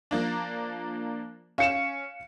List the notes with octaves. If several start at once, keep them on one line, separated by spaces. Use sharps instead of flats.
F3 A#3 D4
C#4 F5 C#7 E7